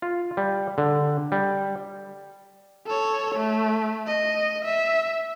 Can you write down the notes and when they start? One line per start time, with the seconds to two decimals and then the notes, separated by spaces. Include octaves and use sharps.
0.02 F4
0.37 G3
0.78 D3
1.32 G3
2.86 A4 C#5
3.35 A3
4.07 D#5
4.64 E5